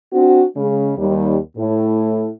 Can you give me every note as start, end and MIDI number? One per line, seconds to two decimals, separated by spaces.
0.13 0.43 60
0.13 0.43 62
0.13 0.43 66
0.56 0.92 49
0.56 0.92 56
0.97 1.37 39
0.97 1.37 55
1.57 2.30 45